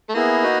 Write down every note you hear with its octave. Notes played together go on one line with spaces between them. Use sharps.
A3
A#3 B3 E4 G#4
D#4 F#4 B4